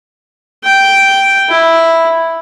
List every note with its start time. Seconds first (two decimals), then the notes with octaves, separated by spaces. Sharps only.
0.64 G5
1.49 E4